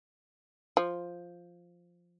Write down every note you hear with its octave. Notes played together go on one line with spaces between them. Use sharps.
F3